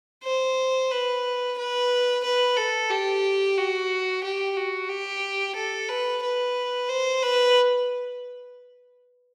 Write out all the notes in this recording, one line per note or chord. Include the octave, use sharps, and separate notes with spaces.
C5
B4
B4
B4
A4
G4
F#4
G4
F#4
G4
A4
B4
B4
C5
B4